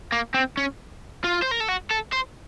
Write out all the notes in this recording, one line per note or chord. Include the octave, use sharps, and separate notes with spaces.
A#3
C4
C#4
F4
C5
A#4
A4
F#4
A4
C5